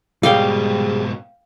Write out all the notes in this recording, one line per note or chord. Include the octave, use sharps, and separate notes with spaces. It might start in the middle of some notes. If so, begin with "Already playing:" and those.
G#2 B2 G3 G#3 G4 F5 G5